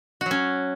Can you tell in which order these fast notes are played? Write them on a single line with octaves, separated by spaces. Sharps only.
F#4 F#3 C#4